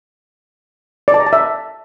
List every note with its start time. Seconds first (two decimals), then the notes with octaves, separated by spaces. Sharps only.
1.08 D5
1.14 A5
1.20 A#5
1.26 A5
1.33 E5